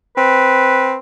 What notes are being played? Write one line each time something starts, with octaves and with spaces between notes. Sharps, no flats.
C4 B4